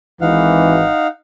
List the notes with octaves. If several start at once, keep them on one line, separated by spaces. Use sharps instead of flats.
G#1 E3 D#4 F5 F#5